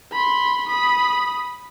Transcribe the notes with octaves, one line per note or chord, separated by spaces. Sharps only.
B5 C6
B5 D#6